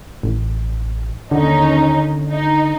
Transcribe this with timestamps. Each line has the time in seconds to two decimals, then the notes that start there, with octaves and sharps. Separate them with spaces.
0.23 A1
1.31 D#2 D3 C#4 D#4
2.29 D#4